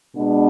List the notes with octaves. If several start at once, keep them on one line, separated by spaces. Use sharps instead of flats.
B2 G#3 B3 D4